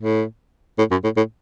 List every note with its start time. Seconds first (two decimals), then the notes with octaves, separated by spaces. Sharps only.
0.01 A2
0.79 A2
0.91 F#2
1.04 A2
1.17 A2